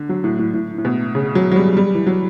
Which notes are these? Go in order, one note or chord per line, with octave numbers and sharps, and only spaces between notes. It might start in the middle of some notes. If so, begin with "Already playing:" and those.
Already playing: D3
F#3
A2
A2
A2
A2
B2
C#3
F#3
F#3
G3
G3
E3
F#3